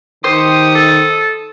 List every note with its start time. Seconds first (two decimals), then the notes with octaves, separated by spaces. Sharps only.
0.24 D#3 G4 C5 D#6 C#7
0.75 A4